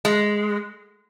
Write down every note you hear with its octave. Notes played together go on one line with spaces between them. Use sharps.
G#3